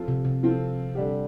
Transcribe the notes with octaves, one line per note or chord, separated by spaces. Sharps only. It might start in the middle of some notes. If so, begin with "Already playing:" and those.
Already playing: F3 C4 F4 A4
C3
C3
F3 C4 F4 A4
D3 G3 D4 G4